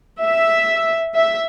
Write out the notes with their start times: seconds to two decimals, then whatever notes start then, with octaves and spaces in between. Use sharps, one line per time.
0.24 E5
1.15 E5